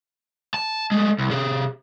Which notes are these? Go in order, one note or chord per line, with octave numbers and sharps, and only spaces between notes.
A5
G#3 A3
C2
C3 G#4